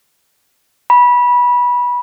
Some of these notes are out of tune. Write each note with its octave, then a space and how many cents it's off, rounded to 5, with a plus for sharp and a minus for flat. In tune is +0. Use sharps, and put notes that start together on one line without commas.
B5 -20